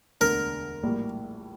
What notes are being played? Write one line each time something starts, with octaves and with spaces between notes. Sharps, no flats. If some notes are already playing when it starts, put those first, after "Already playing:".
E1 D2 D3 A#4
A#1 A2 G3 A#3